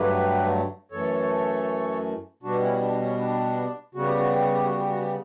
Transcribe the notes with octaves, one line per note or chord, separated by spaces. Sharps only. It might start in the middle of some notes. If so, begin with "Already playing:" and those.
Already playing: G2 D3 F#3 A3 G4 B4
F#2 E3 A3 A4 C#5
B2 G3 B3 D4 F#4
C#4 E4
D4
C#4
D4
C#3 G3 B3 F#4
G4
F#4
G4
F#4
G4
F#4
G4
F#4
G4